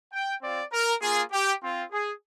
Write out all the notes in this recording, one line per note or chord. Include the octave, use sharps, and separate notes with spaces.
G5
C4 F4 D5
A#4
A#3 F4 G#4
G4
C4 F4
G#4